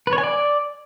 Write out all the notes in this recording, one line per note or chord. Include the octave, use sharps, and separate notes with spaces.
B4
C#5
G#5
D5